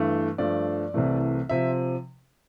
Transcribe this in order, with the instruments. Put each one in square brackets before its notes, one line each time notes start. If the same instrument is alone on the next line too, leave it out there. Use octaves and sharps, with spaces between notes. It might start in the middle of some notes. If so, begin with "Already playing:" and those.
Already playing: [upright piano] G2 E3 A3
G2 F3 A3 D5
C2 C3 E3 A3
C3 F3 E5